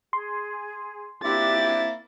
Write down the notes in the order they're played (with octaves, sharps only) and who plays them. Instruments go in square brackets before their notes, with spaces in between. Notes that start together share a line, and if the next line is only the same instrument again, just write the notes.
[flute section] G#4 [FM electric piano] C6
[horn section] A#3 C4 E4 [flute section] D4 G4 D6 [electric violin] A6